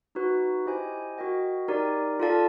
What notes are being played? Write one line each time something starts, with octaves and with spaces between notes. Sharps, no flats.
D#4 F#4 B4
E4 G4 C5 D#5 G#5
F#4 A#4 D#5 G5
D#4 G4 A#4 D5
F4 A4 D5 F5 A5